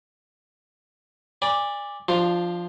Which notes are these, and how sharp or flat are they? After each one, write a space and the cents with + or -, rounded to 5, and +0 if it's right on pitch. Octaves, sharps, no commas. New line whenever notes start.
D5 +0 G#5 -30 B5 -25
F3 +0 D4 +20 F4 +0